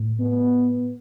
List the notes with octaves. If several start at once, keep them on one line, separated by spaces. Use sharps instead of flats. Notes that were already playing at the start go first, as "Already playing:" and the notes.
Already playing: A2
B3